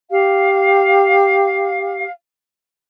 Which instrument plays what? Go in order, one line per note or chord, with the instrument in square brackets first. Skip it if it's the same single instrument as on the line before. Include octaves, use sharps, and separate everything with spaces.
[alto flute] G4 [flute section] F5